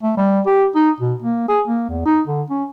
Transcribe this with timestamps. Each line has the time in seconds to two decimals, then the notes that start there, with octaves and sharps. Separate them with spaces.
0.03 A3
0.17 G3
0.46 G4
0.75 D#4
1.00 B2
1.22 A#3
1.49 G#4
1.68 A#3
1.89 E2
2.06 D#4
2.27 D3
2.50 C#4